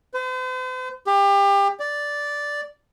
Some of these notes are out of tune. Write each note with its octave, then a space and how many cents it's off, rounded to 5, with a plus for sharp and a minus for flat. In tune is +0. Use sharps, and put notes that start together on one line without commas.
C5 -45
G4 +30
D5 -5